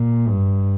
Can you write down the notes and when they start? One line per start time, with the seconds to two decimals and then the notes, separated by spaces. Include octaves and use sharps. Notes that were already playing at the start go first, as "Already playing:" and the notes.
Already playing: A#2
0.29 G2